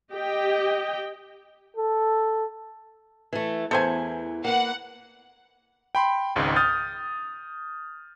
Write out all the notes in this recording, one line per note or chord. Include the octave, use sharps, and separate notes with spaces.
G4 D#5 G5
A4
E3 A3
E2 E3 A4 C5 G#5
A#3 B4 F#5
G5 B5 C6
G#1 C#2 G#2
D#6 F6 G6 A6